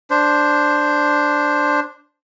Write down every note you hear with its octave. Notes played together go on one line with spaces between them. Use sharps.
D4 C5